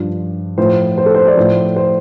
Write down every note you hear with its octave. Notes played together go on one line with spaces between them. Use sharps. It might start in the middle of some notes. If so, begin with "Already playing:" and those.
Already playing: G2 F3
A2 F3 C5
C5
A4
C5
D5
A2 F3 C5
C5